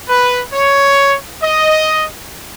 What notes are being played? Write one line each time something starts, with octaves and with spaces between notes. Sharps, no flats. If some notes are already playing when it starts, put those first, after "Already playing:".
B4
C#5
D#5